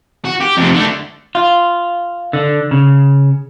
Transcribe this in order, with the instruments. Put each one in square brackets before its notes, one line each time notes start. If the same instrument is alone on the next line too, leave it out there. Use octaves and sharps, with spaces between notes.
[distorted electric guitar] F#4
G4
F2 C3
D3 A3
[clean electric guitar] F4
D3
C#3